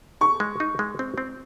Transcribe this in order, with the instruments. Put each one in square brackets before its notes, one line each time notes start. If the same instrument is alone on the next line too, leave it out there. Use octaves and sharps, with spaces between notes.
[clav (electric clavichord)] D#4 [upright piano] C#6
[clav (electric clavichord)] G#3
D#4
G#3
C4
C4